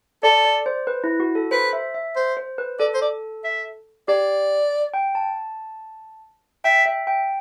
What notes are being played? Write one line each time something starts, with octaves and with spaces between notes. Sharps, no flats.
A4 D5
D5
C5
B4
E4
F#4
A4
B4 C5
E5
E5
C5
C5
B4
A4 D5
C5
D5
E5
G4 D5
G5
A5
E5 G5
E5
G5